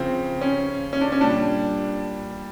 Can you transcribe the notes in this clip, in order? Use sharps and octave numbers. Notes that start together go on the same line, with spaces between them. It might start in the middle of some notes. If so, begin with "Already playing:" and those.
Already playing: C#3 F3 C4
C#4
C#4
D4
C#4
A#2 G3 D4